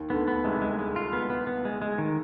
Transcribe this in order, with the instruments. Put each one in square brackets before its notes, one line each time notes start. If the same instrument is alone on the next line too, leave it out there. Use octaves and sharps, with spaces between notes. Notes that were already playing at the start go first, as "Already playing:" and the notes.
Already playing: [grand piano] D#2 D#3
[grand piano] D2 D3 [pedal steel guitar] B3
[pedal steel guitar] B3
[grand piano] C2 C3 [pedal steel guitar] G#3
[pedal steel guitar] G#3
G#3
F4
B3
B3
B3
G#3
G#3
D#3